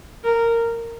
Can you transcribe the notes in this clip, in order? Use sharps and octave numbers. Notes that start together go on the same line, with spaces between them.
A#4